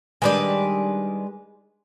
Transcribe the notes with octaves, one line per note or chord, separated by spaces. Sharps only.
D#3 G3 G#3 D4 B4 D5